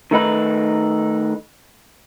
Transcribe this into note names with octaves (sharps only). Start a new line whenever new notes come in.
D#3 A3 D#4 B4